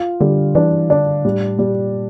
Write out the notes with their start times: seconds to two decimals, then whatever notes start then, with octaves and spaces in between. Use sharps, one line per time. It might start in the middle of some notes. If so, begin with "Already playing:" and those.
Already playing: F4
0.20 D3 G3
0.55 E3 D4
0.90 D3 D4
1.25 A2 G3
1.59 A#2 G3